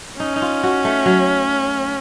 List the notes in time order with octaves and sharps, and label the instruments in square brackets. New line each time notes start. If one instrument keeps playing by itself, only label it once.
[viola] C#4 [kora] D#4
[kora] D#4
F4
F#4
A3
F#3